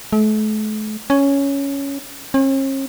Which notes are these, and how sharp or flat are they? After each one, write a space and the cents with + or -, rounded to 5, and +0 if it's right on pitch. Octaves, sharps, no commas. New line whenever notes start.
A3 -40
C#4 +5
C#4 -45